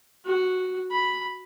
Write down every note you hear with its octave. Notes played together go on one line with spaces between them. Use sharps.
F#4
B5